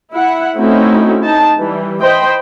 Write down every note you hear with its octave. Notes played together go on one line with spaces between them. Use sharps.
E4 F#5
A3 C4 C#4 D#4 E4 F#4
D#4 A5
E3 G3
C5 D#5 G5 B5